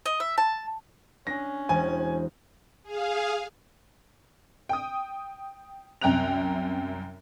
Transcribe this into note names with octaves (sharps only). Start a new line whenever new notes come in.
D#5
E5
A5
C#4 D4 A#6
E1 C5 G#5
G#4 F5
G5 D#6
C2 F#2 G5 A#5 F#6 F7